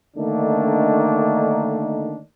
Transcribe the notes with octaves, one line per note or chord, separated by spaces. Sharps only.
D3 D#3 A3 A#3 D4 D#4